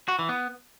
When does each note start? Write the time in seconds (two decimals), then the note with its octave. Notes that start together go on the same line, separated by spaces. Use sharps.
0.08 F#4
0.19 E3
0.29 B3